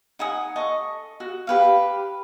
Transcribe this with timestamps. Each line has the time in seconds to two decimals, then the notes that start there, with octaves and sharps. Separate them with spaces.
0.19 D#4 F#5 G#5 D#6
0.56 A4 D#5 C#6
1.20 F#4
1.47 G4 B4 F5